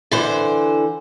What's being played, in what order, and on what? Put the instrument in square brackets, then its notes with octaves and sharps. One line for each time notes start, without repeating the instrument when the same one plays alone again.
[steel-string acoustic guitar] D3 E3 C5